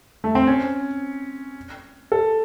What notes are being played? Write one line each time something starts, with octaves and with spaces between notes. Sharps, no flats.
A3
C4
C#4
A4